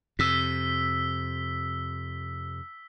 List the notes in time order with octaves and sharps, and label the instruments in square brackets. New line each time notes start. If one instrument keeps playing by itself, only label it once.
[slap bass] F2 C3 [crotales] E6 B6